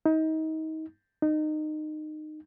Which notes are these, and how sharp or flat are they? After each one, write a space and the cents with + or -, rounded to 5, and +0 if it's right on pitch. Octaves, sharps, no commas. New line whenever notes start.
D#4 +30
D#4 -20